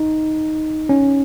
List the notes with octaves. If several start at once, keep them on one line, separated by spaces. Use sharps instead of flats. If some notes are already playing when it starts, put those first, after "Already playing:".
Already playing: D#4
C#4